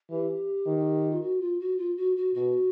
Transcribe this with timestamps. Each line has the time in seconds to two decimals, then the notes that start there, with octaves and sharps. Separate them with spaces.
0.10 E3 G4
0.67 D#3
1.11 F4
1.22 F#4
1.41 F4
1.60 F#4
1.78 F4
1.97 F#4
2.16 F#4
2.35 B2 F#4